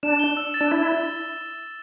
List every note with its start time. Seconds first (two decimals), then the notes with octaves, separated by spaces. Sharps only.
0.03 D4 E7
0.19 G7
0.37 E6
0.54 A6
0.61 D4
0.71 E4 E7